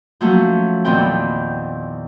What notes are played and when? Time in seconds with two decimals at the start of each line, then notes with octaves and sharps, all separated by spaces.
0.21 F3 F#3 A3 A#3 C#4
0.85 E2 A#2 D#3 B3 C4 G5